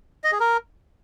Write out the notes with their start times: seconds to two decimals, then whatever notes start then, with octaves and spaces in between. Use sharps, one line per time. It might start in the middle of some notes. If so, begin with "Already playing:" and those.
0.24 D#5
0.32 G#4
0.40 A#4